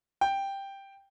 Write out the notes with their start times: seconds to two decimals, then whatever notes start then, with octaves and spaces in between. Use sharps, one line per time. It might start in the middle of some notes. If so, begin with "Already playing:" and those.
0.21 G5